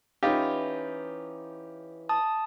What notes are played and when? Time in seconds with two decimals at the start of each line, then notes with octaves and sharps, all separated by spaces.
0.23 E3 C#4 D#4 F4 G4
2.09 A5 D#6